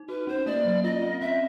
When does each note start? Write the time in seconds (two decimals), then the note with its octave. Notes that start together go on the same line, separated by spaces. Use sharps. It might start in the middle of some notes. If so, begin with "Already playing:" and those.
Already playing: D#4
0.09 F#4 B4
0.27 C#4 C5
0.46 A#3 D5
0.65 F#3
0.84 F4 D#5
1.02 C4
1.21 C#4 E5